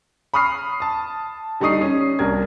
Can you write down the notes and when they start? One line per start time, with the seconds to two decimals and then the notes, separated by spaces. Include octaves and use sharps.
0.34 B5 C#6 D#6 F6 C7
0.80 A5 D#6
1.60 D3 G3 D#4 C#6 D#6 C7
1.81 C#4
2.19 C2 G3 D4 A#4 G#6